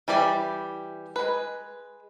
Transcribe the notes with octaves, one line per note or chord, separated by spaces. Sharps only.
E3 G3 G4 D5
G#3 B4